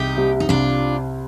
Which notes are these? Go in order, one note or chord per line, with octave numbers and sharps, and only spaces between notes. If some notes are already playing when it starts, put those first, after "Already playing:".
Already playing: C2 D#4 G4
C3 G3
D#4
C2 D4 F4